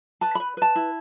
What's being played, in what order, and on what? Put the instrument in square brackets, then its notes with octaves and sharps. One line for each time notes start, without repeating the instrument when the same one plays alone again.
[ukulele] B4 A5
B4 B5
B4 A5
E4